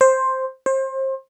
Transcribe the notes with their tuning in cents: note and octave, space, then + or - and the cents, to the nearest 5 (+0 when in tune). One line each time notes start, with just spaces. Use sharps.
C5 +5
C5 +30